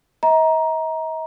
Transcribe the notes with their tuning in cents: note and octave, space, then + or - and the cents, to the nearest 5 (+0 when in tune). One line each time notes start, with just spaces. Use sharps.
D#5 +45 A#5 +10